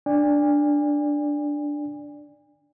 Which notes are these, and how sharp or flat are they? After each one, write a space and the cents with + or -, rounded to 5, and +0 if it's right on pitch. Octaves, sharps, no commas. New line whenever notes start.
D4 +0 D5 +0 G#5 -40